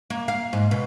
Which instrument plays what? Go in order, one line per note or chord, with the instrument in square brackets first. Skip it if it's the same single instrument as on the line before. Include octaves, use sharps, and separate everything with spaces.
[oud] A#3
F5
G#2
B2